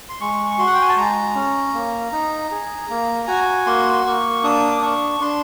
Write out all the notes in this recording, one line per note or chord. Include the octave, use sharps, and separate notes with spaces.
C6
G#3 C#6
C#6
F#4 C6
F#5
G5
G#5
A5
G#3 A#5
C#4
A#3
D#4
G#4
A#3
F#4 G#5
A#3 C6
C6
A#3 C#6
D4 D#6
D6
D4 C#6
D4 C6